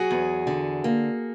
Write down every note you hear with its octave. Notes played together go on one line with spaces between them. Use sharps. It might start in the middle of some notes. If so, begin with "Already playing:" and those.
Already playing: F#3 F#4 G#4
E2
D3
A#3